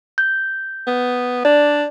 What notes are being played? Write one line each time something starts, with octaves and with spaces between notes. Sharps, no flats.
G6
B3
D4 D5